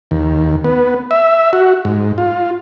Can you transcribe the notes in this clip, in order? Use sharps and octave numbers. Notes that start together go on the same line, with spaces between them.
D#2
B3
E5
F#4
G#2
F4